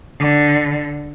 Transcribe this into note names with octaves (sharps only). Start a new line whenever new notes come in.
D3